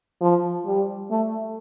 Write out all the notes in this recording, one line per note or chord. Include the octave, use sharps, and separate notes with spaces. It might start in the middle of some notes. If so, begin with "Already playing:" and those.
F3
G3
A3